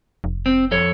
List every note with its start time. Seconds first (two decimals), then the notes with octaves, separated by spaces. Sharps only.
0.24 F1
0.46 C4
0.71 F2 A4 C#5